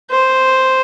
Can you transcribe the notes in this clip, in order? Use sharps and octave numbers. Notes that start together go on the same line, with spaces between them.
C5